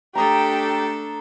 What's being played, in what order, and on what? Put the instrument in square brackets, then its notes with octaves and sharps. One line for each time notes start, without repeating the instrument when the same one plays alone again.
[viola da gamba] A3 D4 A4 [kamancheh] G4 G5 [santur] A#5 D#6